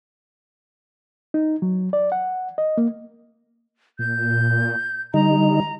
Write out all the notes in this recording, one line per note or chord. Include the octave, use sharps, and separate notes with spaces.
D#4
F#3
D5
F#5
D#5
A#3
A#2 G6
D3 G3 D#4 D#5 A#5